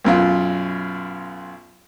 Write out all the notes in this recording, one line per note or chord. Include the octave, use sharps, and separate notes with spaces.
B1 F#2 F4